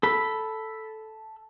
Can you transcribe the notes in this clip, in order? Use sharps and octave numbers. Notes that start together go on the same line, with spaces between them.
A4 B5